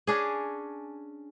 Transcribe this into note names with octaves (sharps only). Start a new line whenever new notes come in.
C#4 D4 G#4